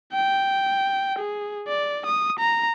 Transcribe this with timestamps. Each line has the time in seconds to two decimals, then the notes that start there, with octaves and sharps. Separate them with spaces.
0.13 G5
1.19 G#4
1.68 D5
2.06 D#6
2.39 A#5